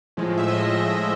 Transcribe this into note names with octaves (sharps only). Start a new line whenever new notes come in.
A2 F3 G#3
E5
D#5